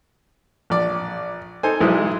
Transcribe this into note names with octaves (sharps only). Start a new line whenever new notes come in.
A#1 D5
D#4 A4 C5 G#5
B1 E3 G#3 E4